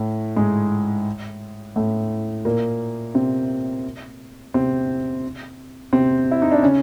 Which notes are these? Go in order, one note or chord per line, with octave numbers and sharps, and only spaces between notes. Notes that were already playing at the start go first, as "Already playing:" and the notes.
Already playing: A2 A3
G#2 G#3
A2 A3
A#2 A#3
C3 C4
C3 C4
C3 C4
E4
D#4
D4
C#3 C#4